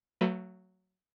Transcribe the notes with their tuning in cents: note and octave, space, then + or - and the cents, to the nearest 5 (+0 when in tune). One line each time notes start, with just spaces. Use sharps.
F#3 +0 A3 +35 B4 +0